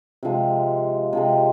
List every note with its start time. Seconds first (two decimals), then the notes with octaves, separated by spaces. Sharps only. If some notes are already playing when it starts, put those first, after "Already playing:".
0.23 C3 F3 G#3
1.13 C3 F3 G#3